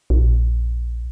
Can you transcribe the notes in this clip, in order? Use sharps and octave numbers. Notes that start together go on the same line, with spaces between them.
A#1